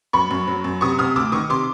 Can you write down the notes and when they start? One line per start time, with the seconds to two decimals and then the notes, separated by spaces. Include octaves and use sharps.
0.13 F#2 B5 C#6
0.31 F#2
0.48 F#3
0.64 F#2
0.81 C3 C#6 D#6
0.99 C3 D#6 F6
1.16 D2 D6 E6
1.32 D#3 C#6 D#6
1.50 C3 C6 D6